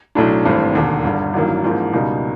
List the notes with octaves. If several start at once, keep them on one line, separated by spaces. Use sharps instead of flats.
B1 A2 F#3 A3 D4
G#1 G2 E3 A3 C4
E1 D#2 D3
G1 G2 D3
A1 G2 D#3 F#3 A#3
A1 G#2 F3 A#3
C#2 B2 G3 A#3 D#4